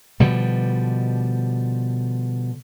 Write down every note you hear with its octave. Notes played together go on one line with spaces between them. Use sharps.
B2 D3 F3 G3